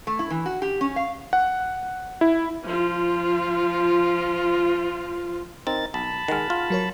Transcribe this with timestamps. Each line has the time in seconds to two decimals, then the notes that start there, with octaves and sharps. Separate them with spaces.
0.07 A3
0.19 E4
0.30 E3
0.46 F#4
0.62 G4
0.81 C#4
0.96 F5
1.33 F#5
2.21 E4
2.64 F3 F4
5.67 C4 D#4 A#4 A6
5.94 B1 A5 B5
6.28 D#3 G#3 F#5 F6
6.50 F4
6.70 F#3 A#4 C#5